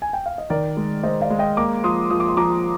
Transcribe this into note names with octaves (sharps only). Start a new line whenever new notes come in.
G#5
G5
F5
D#5
D#3 A#4 D5
G#3
G#3 C5 D#5
D5 F5
G#3
D#5 G5
A#3 A#5 D6
F3 C6 D#6
F3 D#6
D6
C6
F3 A#5 D6